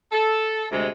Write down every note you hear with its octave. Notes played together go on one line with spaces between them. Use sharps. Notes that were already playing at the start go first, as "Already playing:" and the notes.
A4
D2 C3 G#3